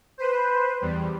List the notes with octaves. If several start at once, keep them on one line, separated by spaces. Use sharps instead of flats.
B4 C5
E2 G3